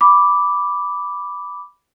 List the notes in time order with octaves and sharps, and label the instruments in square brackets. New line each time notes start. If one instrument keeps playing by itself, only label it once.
[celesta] B5 D6